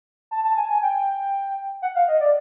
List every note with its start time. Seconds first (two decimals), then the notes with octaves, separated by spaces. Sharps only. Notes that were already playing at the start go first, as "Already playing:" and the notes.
0.31 A5
0.44 A5
0.57 G#5
0.70 G#5
0.82 G5
1.82 F#5
1.95 F5
2.08 D#5
2.20 D5